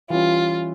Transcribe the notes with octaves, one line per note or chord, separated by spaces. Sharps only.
E3 G3 C#4 F4